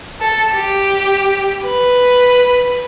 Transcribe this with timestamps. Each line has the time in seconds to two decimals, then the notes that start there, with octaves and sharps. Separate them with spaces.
0.21 A4
0.54 G4
1.65 B4